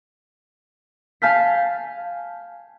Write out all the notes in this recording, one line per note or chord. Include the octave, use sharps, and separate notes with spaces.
F5 G#5 A5 F6 G6 B6